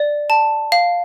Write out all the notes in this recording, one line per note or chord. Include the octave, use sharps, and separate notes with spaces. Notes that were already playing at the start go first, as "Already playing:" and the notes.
Already playing: D5
A5
F5